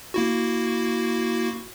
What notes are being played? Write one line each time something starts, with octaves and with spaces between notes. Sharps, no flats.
A#3 E4 F#4